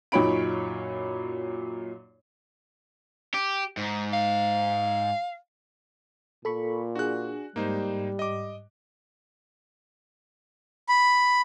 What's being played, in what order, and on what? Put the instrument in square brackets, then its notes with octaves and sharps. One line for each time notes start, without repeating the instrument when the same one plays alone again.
[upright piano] F#2 A#2 D#4 C#5 B5 D7
[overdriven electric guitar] G4
G#2
[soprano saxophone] F5
[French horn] A#2 [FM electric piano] A4 B5 C#6
[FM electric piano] D4 G#4 [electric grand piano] F#4 F#6
[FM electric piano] G#2 [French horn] G3 [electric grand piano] A#3 D#4 C5
[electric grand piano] D#5 D6
[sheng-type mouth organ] B5